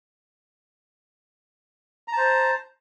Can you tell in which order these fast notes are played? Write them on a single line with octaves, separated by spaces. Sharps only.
A#5 A5 C5